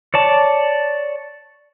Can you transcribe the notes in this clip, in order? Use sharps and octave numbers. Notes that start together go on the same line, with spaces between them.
C#5 D5 A5